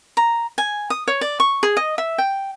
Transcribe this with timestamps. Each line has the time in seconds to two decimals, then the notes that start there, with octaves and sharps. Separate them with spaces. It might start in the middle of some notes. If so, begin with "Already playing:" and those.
0.17 A#5
0.58 G#5
0.90 D#6
1.08 C#5
1.21 D5
1.40 C#6
1.63 G#4
1.77 D#5
1.98 E5
2.18 G5